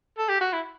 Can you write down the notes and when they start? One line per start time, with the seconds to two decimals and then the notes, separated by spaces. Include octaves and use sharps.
0.18 A4
0.29 G4
0.41 F#4
0.53 E4